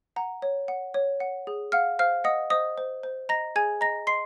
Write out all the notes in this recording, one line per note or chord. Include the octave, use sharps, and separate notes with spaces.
F#5 A#5
C#5
F#5
C#5
F#5
G#4
F5 F#5 F6
C5 F5 F6
D#5 F#5 D#6
C5 D#5 D#6
C5
C5
D#5 A#5 A#6
G#4 G#5 G#6
D#5 A#5 A#6
D#5 C6 C7